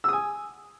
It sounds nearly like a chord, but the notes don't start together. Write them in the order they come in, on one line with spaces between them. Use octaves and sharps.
E6 D#6 G#5